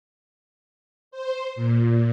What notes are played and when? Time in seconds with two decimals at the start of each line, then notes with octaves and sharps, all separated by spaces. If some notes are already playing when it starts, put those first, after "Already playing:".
1.11 C5
1.56 A#2